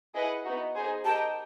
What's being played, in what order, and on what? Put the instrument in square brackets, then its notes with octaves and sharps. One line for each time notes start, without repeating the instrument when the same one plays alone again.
[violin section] E4 G#4 B4 D#5 F#5
B3 D#4 F#4
D#4 G#4 C5
[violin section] G4 A#4 D#5 G5 [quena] A5